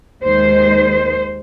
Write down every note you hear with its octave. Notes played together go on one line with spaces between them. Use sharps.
D#2 D#3 G#3 C5